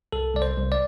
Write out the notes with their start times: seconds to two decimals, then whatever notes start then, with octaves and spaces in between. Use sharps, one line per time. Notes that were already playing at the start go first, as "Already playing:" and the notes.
0.12 C2 A4
0.35 C2 D5
0.42 C5
0.57 C2
0.72 D5